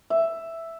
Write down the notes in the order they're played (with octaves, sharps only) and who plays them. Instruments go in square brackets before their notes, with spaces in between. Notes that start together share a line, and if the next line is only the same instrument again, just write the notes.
[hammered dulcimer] E5